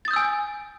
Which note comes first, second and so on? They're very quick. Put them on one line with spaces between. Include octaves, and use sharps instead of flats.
A6 D#6 G6 E6 G#5